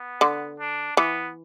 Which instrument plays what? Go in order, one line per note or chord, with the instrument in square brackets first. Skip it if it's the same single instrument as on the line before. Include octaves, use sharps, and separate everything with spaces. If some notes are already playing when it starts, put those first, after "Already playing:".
Already playing: [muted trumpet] B3
[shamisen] D3
[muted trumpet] D4
[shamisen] E3 [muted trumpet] B3